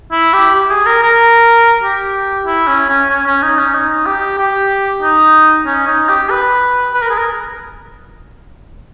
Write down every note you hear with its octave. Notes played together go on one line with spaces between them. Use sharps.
E4
G4
G4
G#4
A#4
A#4
G4
E4
C#4
C#4
C#4
C#4
D#4
C#4
D#4
G4
G4
D#4
C#4
D#4
G4
B4
B4
A#4
G#4
A#4